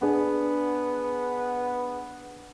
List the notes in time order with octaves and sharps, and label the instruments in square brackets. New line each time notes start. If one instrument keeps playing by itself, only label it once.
[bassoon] B3 [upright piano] D4 G#4